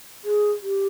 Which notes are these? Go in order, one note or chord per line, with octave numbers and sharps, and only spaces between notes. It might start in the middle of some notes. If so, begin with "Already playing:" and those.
G#4
G4